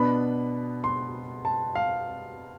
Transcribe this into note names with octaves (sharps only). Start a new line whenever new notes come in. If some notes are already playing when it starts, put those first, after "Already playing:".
Already playing: B2 B3 D4 B5
C6
A5
F5